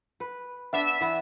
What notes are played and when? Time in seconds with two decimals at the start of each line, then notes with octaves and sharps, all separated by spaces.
0.20 B4
0.73 B3 D4 E5
1.01 E3 B3